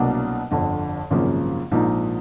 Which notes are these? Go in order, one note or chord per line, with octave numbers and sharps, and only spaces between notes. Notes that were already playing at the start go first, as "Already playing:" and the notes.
Already playing: C2 B2 F#3 A#3 D4
G1 F2 D3
G#1 F#2 C#3 F3 A#3
A#1 G#2 F3 A#3 D#4